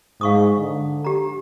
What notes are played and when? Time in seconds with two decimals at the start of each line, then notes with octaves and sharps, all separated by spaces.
0.21 G#2 F5 C#6 D#6
0.58 D3
1.05 G4 A#5